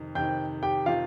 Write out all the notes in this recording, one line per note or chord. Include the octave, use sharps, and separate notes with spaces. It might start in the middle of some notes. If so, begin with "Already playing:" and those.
Already playing: F2 C3 D#3
F2 C3 D#3 G5 G6
G4 G5
C3 D#3 F4 F5